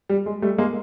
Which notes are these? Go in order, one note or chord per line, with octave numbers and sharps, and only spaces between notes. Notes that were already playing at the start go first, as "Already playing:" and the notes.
G3
G#3
G3 A3
G#3 A#3